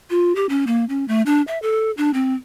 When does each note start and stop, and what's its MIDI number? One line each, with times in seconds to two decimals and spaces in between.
0.10 0.35 65
0.35 0.46 67
0.49 0.65 61
0.67 0.85 58
0.89 1.07 61
1.08 1.22 57
1.26 1.42 62
1.47 1.58 76
1.62 1.91 69
1.97 2.11 62
2.14 2.34 60